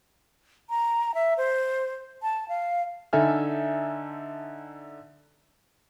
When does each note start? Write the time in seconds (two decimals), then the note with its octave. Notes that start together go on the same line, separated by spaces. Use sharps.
0.70 A#5
1.14 E5
1.38 C5
2.22 A5
2.48 F5
3.13 D3 D#4 A4 E5 G#5 F6